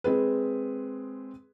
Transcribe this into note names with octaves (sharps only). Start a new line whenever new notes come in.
G#3 C4 G#4 B4